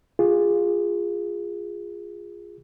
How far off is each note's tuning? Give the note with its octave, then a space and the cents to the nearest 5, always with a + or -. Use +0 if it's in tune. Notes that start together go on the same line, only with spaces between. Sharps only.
F4 +0 G#4 -15